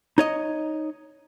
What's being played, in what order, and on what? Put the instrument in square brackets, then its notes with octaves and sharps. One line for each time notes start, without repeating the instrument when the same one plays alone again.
[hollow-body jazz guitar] D#4 C#5 D#5